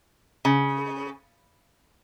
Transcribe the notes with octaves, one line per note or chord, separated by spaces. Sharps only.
C#3